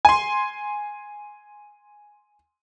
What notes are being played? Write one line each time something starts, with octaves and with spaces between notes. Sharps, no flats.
G#5 C6